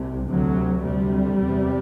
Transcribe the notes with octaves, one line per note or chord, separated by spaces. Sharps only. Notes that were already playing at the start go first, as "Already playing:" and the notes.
Already playing: C2 C3
D2 C3 F#3
D2 C3 G3
E2 C3